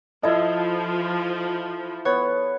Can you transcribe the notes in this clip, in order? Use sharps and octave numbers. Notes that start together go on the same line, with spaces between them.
F3 E4 A4 D#5
B3 C#5